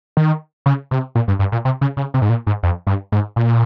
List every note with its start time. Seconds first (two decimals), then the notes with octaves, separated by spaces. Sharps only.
0.17 D#3
0.66 C#3
0.91 C3
1.15 A#2
1.28 G2
1.39 G2
1.52 A#2
1.65 C3
1.81 C#3
1.97 C#3
2.14 C3
2.22 G#2
2.29 A#2
2.47 G#2
2.63 F2
2.87 G2
3.12 G#2
3.36 A#2